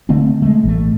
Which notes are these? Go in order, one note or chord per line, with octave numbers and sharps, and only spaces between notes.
D3 A3 A#3 C4
G#3 A3
A1 A3